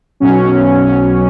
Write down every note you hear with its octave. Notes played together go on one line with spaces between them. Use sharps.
B1 B2 F#3 C#4